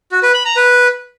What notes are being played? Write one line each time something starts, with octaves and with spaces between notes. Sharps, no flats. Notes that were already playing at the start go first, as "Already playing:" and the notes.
F#4
B4
B5
A#5
B4